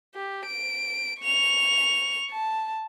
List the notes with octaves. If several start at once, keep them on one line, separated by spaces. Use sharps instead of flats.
G4
D7
C#6 F7
A5